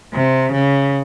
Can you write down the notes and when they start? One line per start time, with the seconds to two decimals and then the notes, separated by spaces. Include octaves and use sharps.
0.14 C3
0.52 C#3